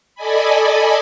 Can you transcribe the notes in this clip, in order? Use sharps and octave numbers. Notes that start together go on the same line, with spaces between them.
A4 D5 D#5 G#5 B5